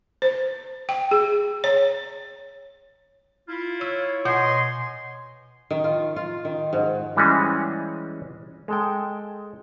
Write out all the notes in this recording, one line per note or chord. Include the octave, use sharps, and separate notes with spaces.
C5
G5
G#4
C#5
E4 F4
C#5 E6
B2 D#5 F#5 G#5 C6 G6
D#3
F4
F4
D#3
G#2
E3 G3 G#3 C#4 F#4 G#4
G#3 A4 G5